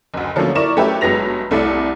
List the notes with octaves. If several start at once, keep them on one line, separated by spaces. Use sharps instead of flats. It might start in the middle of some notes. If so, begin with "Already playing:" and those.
F#1 D2
D3 F3 F#3 A3 A#3 C#4
E4 A#4 D5 C#6 E7
F#3 A3 C#4 G4 B4 E5
G1 F#3 G#3 B3 A#6 F7
C2 A3 E4 D5 C#7